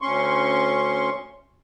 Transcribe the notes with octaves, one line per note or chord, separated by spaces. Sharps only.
D2 C#4 C6 C#6